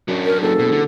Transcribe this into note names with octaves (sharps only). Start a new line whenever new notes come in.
F#2 F#3 D4
A#4
F#1 A4
B2
D3